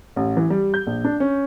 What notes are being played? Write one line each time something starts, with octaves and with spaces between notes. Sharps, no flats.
A1
E3
G3
G6
A#1
D4
C#4